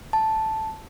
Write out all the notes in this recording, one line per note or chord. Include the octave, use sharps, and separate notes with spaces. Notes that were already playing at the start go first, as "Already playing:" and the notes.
A5